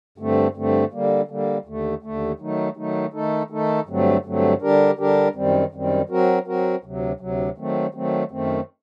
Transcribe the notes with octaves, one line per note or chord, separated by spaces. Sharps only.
G2 D3 A3 C4
G2 D3 A3 C4
D3 G3 A#3
D3 G3 A#3
D#2 D3 A3
D#2 D3 A3
D#3 F#3 A3 D#4
D#3 F#3 A3 D#4
D#3 A3 D#4 A4
D#3 A3 D#4 A4
G2 D3 F#3 A3 C4
G2 D3 F#3 A3 C4
D3 G3 D4 G4 A#4
D3 G3 D4 G4 A#4
F#2 D#3 G3 C4
F#2 D#3 G3 C4
F#3 C4 F#4 A#4
F#3 C4 F#4 A#4
D2 C3 F#3
D2 C3 F#3
D#3 F#3 A3 C4
D#3 F#3 A3 C4
F#2 D#3 A3 C4